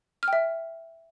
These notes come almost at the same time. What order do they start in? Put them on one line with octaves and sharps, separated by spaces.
F6 G5 E5